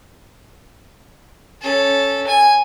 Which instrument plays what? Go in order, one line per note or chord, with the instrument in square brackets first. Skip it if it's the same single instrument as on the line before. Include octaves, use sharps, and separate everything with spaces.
[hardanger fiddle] C#4 A4
G#5